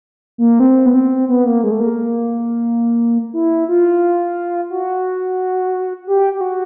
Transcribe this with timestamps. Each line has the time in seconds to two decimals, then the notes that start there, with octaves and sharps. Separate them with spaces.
0.38 A#3
0.60 C4
0.86 B3
0.94 C4
1.29 B3
1.46 A#3
1.63 G#3
1.71 A3
1.80 A#3
3.33 E4
3.69 F4
4.70 F#4
6.07 G4
6.33 G4
6.41 F#4